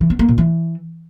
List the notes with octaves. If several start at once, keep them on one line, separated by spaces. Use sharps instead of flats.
E3
B3
A#3
A#2
E3